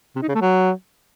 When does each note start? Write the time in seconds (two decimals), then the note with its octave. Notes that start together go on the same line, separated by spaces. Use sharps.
0.16 C3
0.22 D#4
0.28 C#3
0.35 A3
0.41 F#3